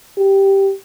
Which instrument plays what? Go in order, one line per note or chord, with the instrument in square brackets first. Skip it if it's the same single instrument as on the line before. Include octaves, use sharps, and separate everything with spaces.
[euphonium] G4